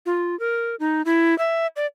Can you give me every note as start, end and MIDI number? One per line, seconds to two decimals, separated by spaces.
0.06 0.38 65
0.40 0.75 70
0.80 1.02 63
1.05 1.37 64
1.38 1.67 76
1.76 1.86 74